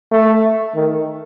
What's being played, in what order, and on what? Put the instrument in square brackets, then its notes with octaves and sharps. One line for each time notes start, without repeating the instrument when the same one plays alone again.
[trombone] A3
D#3